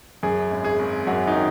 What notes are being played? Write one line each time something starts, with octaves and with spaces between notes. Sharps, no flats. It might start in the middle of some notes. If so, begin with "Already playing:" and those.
F#2 G#4
G#1
G#4
G#1
F#2 F#4
D#4
D#3